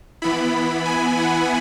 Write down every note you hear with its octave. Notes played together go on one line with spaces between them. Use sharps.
E3 B3 E4 B5
G#5
F#5